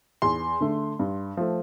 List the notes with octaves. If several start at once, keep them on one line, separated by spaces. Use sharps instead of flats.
E2 C6
D3 A3
G2
F3 A3